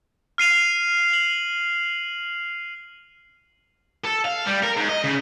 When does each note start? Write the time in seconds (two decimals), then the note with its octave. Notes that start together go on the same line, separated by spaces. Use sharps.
0.38 F6 C7 D#7 F7
1.13 F#7
4.04 A4
4.24 F5
4.46 G3
4.63 A#4
4.77 G#2
4.89 D#5
5.04 C#3